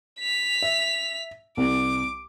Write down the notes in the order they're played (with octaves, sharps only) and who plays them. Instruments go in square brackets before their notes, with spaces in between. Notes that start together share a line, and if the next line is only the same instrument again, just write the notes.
[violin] B6 F7
[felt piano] E5
[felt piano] C2 [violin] D6